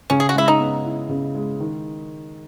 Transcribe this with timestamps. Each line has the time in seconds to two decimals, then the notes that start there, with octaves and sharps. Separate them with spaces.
0.10 C#3 C#4
0.20 G#4
0.29 F#4
0.35 G#3 E4
0.48 D#4
0.60 B3
0.85 E4
1.09 C#3
1.35 G#3
1.60 D#3